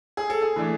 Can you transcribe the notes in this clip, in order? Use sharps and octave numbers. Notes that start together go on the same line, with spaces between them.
G#4
A4
G#4
E3 A3 D4